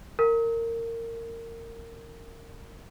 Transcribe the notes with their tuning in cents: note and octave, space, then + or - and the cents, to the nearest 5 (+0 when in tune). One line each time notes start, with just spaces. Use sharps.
A#4 -20